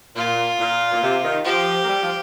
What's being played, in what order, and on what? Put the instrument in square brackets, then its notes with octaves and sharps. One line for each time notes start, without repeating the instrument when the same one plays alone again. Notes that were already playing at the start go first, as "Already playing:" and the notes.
[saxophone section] A#2 [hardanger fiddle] F4
[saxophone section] A#2
A#2
C3
D#3
[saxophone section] F3 [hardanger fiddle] G4
[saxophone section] A#3
G3
F3